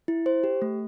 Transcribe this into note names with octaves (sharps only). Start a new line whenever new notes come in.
E4
C5
G4
A3